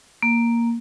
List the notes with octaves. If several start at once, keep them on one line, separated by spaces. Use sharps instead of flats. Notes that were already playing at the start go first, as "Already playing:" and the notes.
A#3